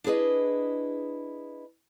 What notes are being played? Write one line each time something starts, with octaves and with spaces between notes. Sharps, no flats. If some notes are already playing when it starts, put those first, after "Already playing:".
D4 E4 G#4 B4 D#5